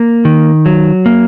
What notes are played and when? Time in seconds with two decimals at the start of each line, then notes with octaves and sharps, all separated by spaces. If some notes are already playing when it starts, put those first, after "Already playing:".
Already playing: A#3
0.25 D#3
0.66 F#3
1.06 A#3